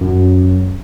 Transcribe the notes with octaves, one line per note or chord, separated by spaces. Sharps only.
F#2